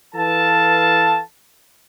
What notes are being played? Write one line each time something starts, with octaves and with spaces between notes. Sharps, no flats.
E3 A4 B4 F5 A5